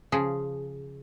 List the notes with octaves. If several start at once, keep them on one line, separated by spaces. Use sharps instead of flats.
C#3 F3 G#4